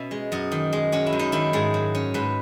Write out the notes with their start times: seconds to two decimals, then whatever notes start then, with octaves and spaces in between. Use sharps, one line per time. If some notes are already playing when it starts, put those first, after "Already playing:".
Already playing: B2 C#4 E5
0.11 G#3
0.32 F#2 D#5
0.52 D#3
0.73 G#3
0.92 C#4 F#4
1.06 E4
1.13 F#2
1.19 D#4
1.32 D#3 E4
1.53 G#2 G#4
1.74 F#3
1.95 C#4
2.14 G#2 B4